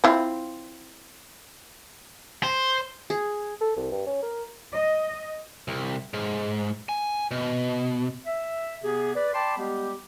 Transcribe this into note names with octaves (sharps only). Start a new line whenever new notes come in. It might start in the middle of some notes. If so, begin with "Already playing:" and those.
C4 E4 F4
C5
G#4
A4
C2
G2
C#4
A#4
D#5
C2
G#2
G#5
B2
E5
C3 B3 G4 G#4
B4 D5
D5 G5 A5 B5 C6 D6
G3 G#3 B3 G4